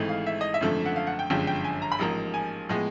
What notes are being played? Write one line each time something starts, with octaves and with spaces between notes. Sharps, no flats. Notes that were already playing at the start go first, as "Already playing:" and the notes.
Already playing: G#1 G#2 E3 A3
F5
E5
D#5
E5
G#1 F#2 D3 F3 A3
F#5
F5
F#5
G5
G1 F#2 D3 F3 G#3 G5
G5
G#5
A#5
B5
A1 G#2 F3 A#3 A#5
G#5
A2 F3 G#3 B3